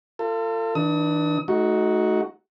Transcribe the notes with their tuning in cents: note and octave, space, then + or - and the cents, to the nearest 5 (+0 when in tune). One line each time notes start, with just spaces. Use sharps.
F4 -25 A4 +35
E3 -35 D4 +15 D#6 +40
A3 -30 D#4 +10 F#4 +0